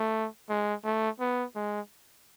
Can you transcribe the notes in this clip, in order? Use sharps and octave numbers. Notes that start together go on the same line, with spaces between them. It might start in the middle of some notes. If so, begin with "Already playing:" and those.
Already playing: A3
G#3
A3
B3
G#3